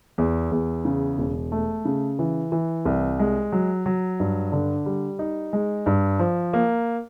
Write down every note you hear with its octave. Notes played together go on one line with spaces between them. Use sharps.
E2
E2
C#3
E1
A3
C#3
E3
E3
C2
G#3
F#3
F#3
G2
D3
G3
D#4
G#3
G2
F3
A#3